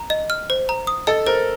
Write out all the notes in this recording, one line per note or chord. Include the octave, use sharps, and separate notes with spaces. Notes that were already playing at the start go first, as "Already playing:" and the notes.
Already playing: A#5
D#5
F6
C5
A#5
D#6
A4 D#5
A#4 C5